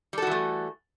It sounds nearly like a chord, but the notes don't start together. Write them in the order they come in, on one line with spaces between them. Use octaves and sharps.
G3 A4 F#4 E3 A3